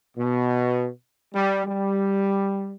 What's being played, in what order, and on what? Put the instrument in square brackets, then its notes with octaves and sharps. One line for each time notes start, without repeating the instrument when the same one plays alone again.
[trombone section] B2
G3
G3